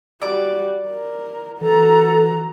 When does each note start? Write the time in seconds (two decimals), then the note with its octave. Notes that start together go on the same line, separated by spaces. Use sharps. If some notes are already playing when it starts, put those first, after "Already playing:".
0.22 G3 F#4 D5 D6
0.88 A#4
1.61 E3 F#4 A4 A#5